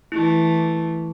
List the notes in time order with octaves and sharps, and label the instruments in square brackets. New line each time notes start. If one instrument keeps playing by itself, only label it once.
[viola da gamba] E3 A3 [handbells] E4